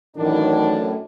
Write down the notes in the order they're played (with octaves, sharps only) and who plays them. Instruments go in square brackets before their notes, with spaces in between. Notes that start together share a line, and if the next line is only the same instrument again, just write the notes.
[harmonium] F#2 A2 [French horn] D#3 [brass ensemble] E3 D4